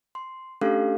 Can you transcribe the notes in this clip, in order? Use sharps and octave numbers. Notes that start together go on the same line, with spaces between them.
C6
A3 C#4 D4 G4 A4 F5